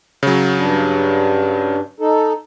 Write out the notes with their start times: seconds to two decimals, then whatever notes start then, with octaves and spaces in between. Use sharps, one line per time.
0.23 C#3 F#3
0.59 G2 D4
2.00 D#4 A4